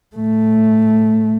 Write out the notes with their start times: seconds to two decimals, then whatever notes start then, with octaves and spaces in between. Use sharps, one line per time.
0.16 A2 A3